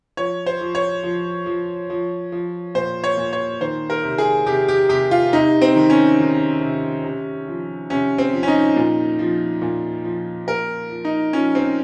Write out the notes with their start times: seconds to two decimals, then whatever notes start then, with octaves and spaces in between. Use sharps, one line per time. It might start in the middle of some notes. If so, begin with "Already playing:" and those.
0.17 F3 C#5
0.46 C5
0.61 F3
0.75 C#5
1.03 F3
1.46 F3
1.90 F3
2.32 F3
2.75 A#2 C5
3.04 C#5
3.17 A#2
3.33 C#5
3.61 D#3 C5
3.90 A#4
4.03 C3
4.18 G#4
4.46 C3 G4
4.68 G4
4.89 C3 G4
5.11 F4
5.33 C3 D#4
5.62 C4
5.76 D#3
5.90 C#4
6.19 D#3
6.61 C3
7.04 C3
7.47 F3
7.90 C3 C#4
8.18 C4
8.33 F3
8.43 C#4
8.48 D#4
8.76 A#2
9.19 F3
9.62 A#2
10.04 F3
10.47 A#2 A#4
10.90 F3
11.05 D#4
11.33 F3 C#4
11.55 C4